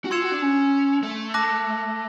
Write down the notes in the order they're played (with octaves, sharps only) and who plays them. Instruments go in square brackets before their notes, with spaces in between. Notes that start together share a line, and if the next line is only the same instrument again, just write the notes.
[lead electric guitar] F#4
[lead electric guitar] F4 [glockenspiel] C6 E6 G#6 C#7 E7
[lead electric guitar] F#4
D4
C#4
A3
[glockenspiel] A5 D6 F#6 A#6